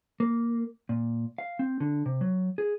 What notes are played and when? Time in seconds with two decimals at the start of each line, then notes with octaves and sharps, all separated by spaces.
0.20 A#3
0.89 A#2
1.38 F5
1.59 C4
1.80 D3
2.06 C3
2.21 F#3
2.58 G#4